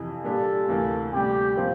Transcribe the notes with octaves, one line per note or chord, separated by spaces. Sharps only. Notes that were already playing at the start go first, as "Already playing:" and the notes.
Already playing: F2 C3 E3
A#2 G3 D4 G4 A4
D2 C3 E3 A#3
D2 C3 G3 G4
A#2 F3 C4